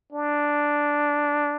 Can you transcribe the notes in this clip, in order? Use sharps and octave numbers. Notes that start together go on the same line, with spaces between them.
D4